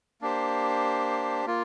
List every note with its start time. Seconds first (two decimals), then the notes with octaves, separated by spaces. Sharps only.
0.21 A#3 D4 G4 C5
1.46 A#3 F4